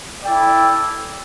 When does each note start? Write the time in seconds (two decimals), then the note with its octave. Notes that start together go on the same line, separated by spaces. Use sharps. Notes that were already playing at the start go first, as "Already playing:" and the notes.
0.24 E4 A4 D5 G5